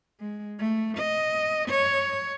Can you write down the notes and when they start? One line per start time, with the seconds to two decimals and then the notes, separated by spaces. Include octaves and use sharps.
0.20 G#3
0.59 A3
0.98 D#5
1.69 C#5